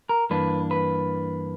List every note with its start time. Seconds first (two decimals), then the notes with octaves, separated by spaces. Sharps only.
0.09 A#4
0.30 G2 E3 A#3 D4 B4
0.71 B4